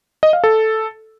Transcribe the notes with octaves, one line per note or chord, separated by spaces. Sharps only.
D#5
F5
A4